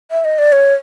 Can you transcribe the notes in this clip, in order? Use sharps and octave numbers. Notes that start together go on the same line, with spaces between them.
E5
D#5
D5
C#5